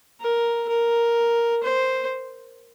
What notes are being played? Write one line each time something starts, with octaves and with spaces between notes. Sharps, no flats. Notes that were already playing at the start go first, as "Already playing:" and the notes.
A#4
A#4
C5